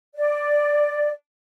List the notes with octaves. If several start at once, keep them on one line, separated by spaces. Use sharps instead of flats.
D5